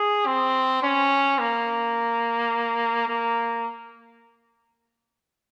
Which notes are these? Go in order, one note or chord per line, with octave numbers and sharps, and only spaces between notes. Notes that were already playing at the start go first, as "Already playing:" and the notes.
Already playing: G#4
C4
C#4
A#3
A#3